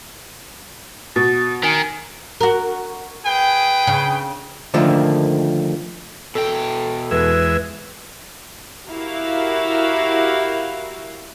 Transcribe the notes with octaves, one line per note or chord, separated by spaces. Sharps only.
B2 A6
D#3 G#5
F#4 A#4
G#4 B4 G5
C#3
D3 D#3 F3 A3 A#3
B2 A4 G5
E2 G#3 B4 E5
E4 F#4 G4 A#4 F5